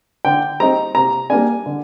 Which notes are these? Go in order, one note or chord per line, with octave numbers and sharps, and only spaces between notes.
D3 G5
G3 C4 D#4 A#5
C3 A#5
G3 A#3 D4 G#5
D3